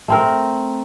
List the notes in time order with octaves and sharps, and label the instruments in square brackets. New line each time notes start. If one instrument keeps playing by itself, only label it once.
[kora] A3 C4 A#4